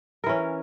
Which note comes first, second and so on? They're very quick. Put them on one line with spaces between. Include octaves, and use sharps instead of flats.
A#4 E3 C#4